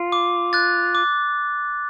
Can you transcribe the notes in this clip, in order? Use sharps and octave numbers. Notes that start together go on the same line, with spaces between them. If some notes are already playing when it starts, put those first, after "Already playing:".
Already playing: F4
D6
F#6 A6
D6